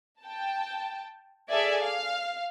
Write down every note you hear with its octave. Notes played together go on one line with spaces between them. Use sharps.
G5 A5
G#4 A4 D5 E5 G#5
F5